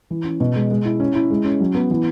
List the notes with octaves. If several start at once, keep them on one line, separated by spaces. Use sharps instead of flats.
E3
C#4
B2
G#3
G#3
E4
C#4
E4
G#3
C#4
F#3
B3
E3